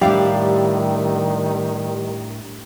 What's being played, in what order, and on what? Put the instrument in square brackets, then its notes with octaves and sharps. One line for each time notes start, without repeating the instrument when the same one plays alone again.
[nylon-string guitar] A2 D4 F5 [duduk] D#3 [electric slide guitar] G3 E4 [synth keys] G4